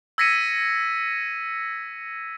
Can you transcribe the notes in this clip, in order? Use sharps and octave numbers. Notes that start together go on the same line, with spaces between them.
E6 G#6 A#6 B6 C#7 D#7